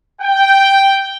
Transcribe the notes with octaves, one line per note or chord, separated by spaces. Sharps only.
G5